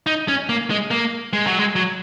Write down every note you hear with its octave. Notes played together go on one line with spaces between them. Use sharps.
D#4
C#4
A#3
G#3
A#3
G#3
F#3
G#3
F#3